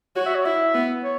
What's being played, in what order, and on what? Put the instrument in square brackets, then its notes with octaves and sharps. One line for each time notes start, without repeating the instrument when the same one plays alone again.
[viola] F#4 [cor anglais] C#5
[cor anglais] E5
C#5
[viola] E4 [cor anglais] E5
[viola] B3
[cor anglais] C#5